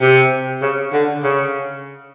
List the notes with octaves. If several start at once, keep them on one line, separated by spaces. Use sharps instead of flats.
C3
C#3
D3
C#3